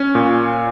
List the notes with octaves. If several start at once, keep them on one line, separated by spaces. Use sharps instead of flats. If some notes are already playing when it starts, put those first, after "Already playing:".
Already playing: C#4
A#2